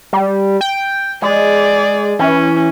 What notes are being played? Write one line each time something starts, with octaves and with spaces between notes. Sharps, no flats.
G3
G5
G#3 G#4 D5
E3 C#4